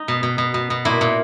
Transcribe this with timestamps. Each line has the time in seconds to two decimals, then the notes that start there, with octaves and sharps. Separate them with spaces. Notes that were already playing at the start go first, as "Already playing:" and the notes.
Already playing: D#4
0.08 B2
0.23 B2
0.38 B2
0.54 B2
0.70 B2
0.85 A#2 E4
1.01 A#2